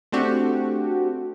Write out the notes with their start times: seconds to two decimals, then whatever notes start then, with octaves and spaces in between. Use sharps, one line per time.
0.12 A3 C4 D4 F#4 G4